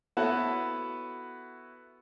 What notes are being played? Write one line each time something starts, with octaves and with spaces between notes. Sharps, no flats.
B3 E4 F#4 A4 B4 C#5